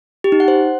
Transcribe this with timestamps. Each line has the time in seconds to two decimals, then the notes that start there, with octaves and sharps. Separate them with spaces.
0.24 G4
0.32 D#4
0.40 F#5
0.48 C5